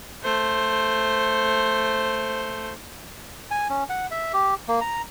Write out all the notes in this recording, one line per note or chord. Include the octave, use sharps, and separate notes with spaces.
A3 C5
G#5
C#4
F#5
E5
G4
A#3
A#5